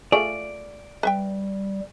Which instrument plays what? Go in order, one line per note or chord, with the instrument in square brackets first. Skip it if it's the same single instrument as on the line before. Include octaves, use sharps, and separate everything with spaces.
[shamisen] A3 F4 G#4 [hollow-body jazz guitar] D5
[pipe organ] G3 [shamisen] B4 E5 G5